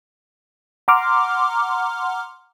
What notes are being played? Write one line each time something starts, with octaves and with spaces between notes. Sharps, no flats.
F#5 A#5 C6 D6 F6